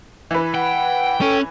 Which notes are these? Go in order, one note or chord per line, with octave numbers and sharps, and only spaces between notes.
E3 B4
F#5 G5
C#4 A4